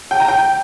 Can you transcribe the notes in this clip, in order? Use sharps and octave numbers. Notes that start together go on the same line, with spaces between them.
G5
A#5
G5